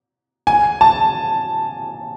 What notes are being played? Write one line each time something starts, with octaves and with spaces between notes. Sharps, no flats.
G#5
A5